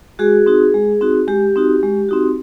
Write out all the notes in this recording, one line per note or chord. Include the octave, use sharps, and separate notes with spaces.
G#3 F#4 G#4
C4 D#4 F#4
G#3
C4 D#4 F#4
G#3 G4
C4 D#4 F#4
G#3
C4 D#4 F#4